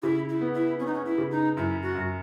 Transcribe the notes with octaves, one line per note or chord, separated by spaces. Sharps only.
C#3 E4
E4
B3
E4
B3 C#4
D#4
C#4
E4
C#3
D#4
F#2 E4
F#4
F#2